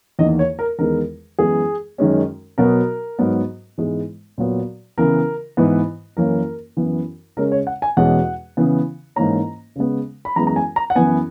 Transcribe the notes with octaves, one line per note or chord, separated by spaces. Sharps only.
E2 D#3 A#3 D#5
C#5
A#4
E2 D#3 G#3 B3 A#4
F#2 E3 G#3 B3 G#4
F#2 D#3 G#3 C#4
B2 F#3 B3 A#4
G#2 F#3 B3
G#2 E3 G#3 B3
A#2 F#3 B3
C#3 E3 B3 A#4
G#2 E3 B3
F#2 E3 A#3 C#4 A#4
F#2 E3 B3
C#3 G#3 C#4 A#4
C#5
F#5
G#5
E2 B2 G#3 C#4 F#5
C#3 E3 B3
G#2 E3 A#3 C#4 A#5
C#3 G#3 B3
B5
F#2 E3 G#3 B3 A#5
A#5
G#5
A#5
F#5
F#2 E3 B3 G#5